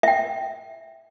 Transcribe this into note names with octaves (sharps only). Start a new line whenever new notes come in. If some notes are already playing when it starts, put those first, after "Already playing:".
E5 G5